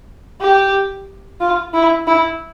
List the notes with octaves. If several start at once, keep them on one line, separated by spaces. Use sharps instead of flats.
G4
F4
E4
E4